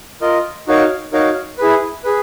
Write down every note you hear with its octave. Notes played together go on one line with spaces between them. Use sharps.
F4 A#4 D#5
D#4 F#4 A#4 C#5 F5
D#4 F#4 A#4 C#5 F5
E4 G#4 B4
G#4 B4